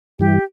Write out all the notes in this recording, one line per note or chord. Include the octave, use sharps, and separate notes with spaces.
G2 E3 G3 G4